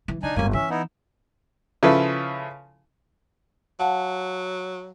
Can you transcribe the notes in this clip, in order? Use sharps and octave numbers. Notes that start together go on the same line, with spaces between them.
E3
D3 D4 D#4 G#5
G1 G#2 A#3 C#4 G#5
E3 C#4 E5
B3 D#4 E4
C#3 F3 E4 A4 B4
F#3 F5 F#5 A5